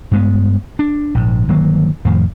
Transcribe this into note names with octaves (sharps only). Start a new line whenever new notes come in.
G2 G#3 B3
D4
A#1 G#2
G1 D#3 F#3 A#3
F2 A2 D#3 F3